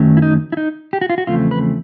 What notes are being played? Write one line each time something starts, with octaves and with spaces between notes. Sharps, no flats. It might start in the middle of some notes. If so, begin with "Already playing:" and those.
Already playing: F#2 D#3 F#3 A3 C#4
E4
D#4
E4
D#4
G4
F#4
F4
F#4
E2 C#3 F3 A3 C4 F4
B4